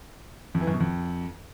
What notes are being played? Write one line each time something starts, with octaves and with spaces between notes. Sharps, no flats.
F2
E3
F#2
B2
F2